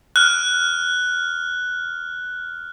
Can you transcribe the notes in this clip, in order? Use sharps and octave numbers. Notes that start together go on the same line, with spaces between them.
F6 F#6